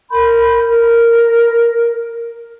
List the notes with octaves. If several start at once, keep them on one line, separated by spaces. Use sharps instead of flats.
A#4 B5 C6 G6
A#4